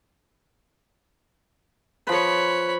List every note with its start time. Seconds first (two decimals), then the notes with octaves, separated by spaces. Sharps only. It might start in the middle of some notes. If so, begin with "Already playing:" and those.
2.07 F3 B4 C#5 B5